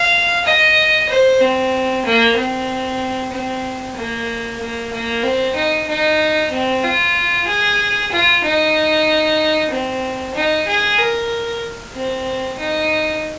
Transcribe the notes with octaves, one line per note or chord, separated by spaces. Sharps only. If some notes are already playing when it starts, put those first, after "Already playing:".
Already playing: F5
D#5
C5
C4
A#3
C4
C4
A#3
A#3
A#3
C4
D#4
D#4
C4
F4
G#4
F4
D#4
C4
D#4
G#4
A#4
C4
D#4